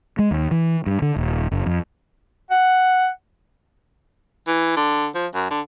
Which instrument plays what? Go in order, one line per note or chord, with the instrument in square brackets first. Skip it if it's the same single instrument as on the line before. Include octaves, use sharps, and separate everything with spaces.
[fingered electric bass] G#3
D#2
E3
G2
D3
D#1
F#1
F2
[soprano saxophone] F#5
[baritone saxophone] E3
D3
F3
F#2
D3